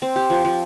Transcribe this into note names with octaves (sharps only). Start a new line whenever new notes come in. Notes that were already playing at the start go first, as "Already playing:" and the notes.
C4
G4
F3
F3